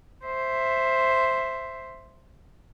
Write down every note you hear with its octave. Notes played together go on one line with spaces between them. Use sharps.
C5 E5